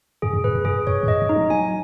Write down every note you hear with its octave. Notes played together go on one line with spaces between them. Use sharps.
F#2 G#4
F#2
F#2 B4
F2
F#2 G#4
F2 C#5
G#2
F#2 D#5
G#2
D#4
F3
F#3 G#5